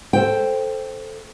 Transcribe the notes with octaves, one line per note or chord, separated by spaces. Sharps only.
A4 C5 G5